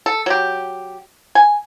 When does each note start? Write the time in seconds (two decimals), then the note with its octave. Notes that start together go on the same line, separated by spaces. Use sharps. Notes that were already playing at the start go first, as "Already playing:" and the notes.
0.06 A4
0.26 F#3 G4
1.35 G#5